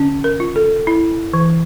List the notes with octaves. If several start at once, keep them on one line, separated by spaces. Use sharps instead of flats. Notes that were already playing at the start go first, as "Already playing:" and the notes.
Already playing: D3 C#4
A#4
F4
A4
E4
E3